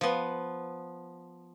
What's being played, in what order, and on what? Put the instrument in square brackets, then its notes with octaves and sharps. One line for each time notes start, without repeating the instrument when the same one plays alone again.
[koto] F3 B3